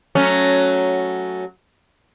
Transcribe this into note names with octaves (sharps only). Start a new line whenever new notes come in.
F#3 A3 C#4